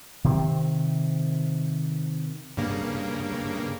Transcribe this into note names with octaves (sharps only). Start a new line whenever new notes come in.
C3 D#3 C4
G2 C#3 A#3